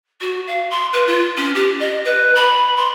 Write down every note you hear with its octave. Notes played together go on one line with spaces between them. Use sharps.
F#4
F5
C6
B4
F4
C#4
G4
D#5
B4
B5
C6